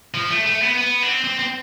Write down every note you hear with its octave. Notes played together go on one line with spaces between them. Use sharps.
F3
A3
A3
B3
B3
D4
C4
C4
C4